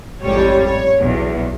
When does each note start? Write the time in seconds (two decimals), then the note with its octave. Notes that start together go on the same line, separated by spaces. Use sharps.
0.23 A1 F2 G#2 G3 C#5
0.65 C#5
0.98 B1 E2